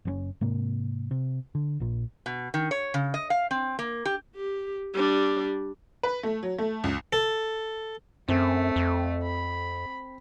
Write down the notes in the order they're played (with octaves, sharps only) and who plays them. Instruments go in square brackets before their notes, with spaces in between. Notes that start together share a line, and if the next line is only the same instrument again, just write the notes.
[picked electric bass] F#1 C#3 C#4
G#2 C3 A#3
C3
D3
A#1 A#2
[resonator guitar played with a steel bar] B2
D#3
C#5
C#3
D#5
F5
C4
A#3
G4
[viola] G4
G3 D4
[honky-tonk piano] B4
A3
F#3
A3
C#2
[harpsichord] A4
[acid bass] F#2 [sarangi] A3 [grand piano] C4
[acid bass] F2
[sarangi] B5